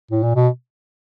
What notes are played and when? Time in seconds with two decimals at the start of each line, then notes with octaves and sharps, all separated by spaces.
0.11 A2
0.23 A#2
0.36 B2